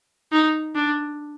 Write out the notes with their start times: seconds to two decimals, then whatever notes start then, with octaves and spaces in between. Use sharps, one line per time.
0.32 D#4
0.75 D4